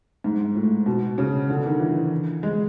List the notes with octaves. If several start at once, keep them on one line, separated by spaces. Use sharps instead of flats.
G#2
A2
B2
C#3
D3
D#3
E3
G#3